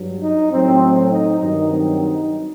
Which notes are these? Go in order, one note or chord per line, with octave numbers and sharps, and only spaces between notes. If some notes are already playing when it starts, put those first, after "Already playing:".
Already playing: G2 F#3
D#4
A2 F#3 C4
C4
D#4
G2 D#3 F#3 D#4
C4
D#4